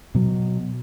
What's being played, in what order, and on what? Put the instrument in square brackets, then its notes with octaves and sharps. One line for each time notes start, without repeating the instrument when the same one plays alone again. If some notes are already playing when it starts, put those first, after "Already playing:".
[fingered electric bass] B2 F#3